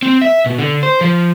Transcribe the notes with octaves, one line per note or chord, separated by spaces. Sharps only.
C4
E5
B2
D3
C5
F3